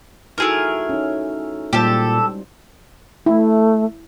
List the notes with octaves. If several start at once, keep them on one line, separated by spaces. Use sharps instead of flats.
A3 D#4 E4 F#4 G#4 A#4
C#4 D#4
A#2 G3 G#3 G4 A4 C5
A3 E4